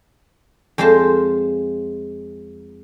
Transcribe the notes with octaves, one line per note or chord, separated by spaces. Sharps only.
F2 G#3 F4 C5 A5